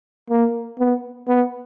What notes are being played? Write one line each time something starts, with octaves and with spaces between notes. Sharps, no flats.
A#3
B3
B3